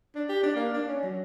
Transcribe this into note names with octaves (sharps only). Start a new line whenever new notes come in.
D4
G4
D4
A#3
D4
C#4
F#3